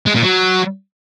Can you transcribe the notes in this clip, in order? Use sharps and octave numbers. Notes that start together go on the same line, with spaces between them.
G#3
A#2
F#3